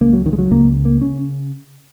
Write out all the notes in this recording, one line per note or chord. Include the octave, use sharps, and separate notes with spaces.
C#2 C#3 A#3
F#3
D#3
G#3
F#3
C#2 C#3 A#3
A#3
C#3 C#4